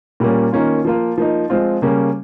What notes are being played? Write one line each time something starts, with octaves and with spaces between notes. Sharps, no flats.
A#2 G3 A#3 C#4
D#3 A#3 C#4 F4
F3 A#3 F4
F3 A#3 D#4
F3 G#3 C4 F4
C#3 G3 A#3 C#4